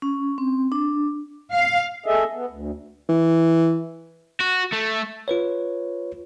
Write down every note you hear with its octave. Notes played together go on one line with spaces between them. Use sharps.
C#4
C4
D4
F5
G#4 A4 D#5 E5
B3
D2
E3
F#4
A3
F4 B4 C#5